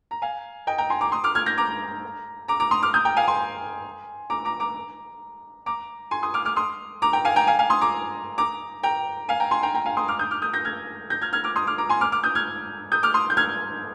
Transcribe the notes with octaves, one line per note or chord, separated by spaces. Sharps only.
A#5
F5 G#5
D#5 G5
G5 A#5
G#5 C6
A#5 D6
C6 D#6
D6 F6
F6 G#6
G6 A#6
A#5 D6
A#5 D6
A#5 D6
C6 D#6
D6 F6
D#6 G6
G5 A#5
F5 G#5
G#5 C6
A#5 D6
A#5 D6
A#5 D6
A#5 D6
G#5 C6
C6 D#6
D6 F6
D6 F6
C6 D#6
A#5 D6
G5 A#5
F5 G#5
G5 A#5
F5 G#5
F5 G#5
C6 D#6
A#5 D6
A#5 D6
G5 A#5
F5 G#5
G5 A#5
G#5 C6
G5 A#5
G5 A#5
F5 G#5
C6 D#6
D6 F6
D#6 G6
D6 F6
D#6 G6
G6 A#6
F6 G#6
G6 A#6
F6 G#6
F6 G#6
D6 F6
C6 D#6
D6 F6
A#5 D6
G#5 C6
D6 F6
D6 F6
D#6 G6
F6 G#6
D#6 G6
D6 F6
C6 D#6
G6
F6 G#6